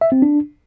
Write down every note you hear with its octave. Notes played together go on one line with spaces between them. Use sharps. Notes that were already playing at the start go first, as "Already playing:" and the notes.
E5
C4
D4